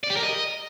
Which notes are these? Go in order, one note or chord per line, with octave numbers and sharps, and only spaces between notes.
D5
G4
A#4
D#5